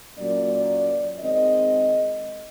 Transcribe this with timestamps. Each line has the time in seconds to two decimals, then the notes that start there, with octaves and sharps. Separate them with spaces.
0.17 A#2 F#3 A#3 C#4 D5
1.19 D#3 G#3 C4 D#5